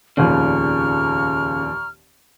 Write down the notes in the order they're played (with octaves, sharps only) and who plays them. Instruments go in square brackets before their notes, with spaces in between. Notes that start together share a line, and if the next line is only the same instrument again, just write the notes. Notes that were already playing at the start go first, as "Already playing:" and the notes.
[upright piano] F1 D#2 A#2 [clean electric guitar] C#3 [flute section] A#5 C#6 F6